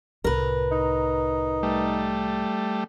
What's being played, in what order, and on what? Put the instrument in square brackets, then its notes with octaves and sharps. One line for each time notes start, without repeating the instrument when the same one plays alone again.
[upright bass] C2 A2 [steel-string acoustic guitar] A#4 B4
[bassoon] D#4
[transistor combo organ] G3 A3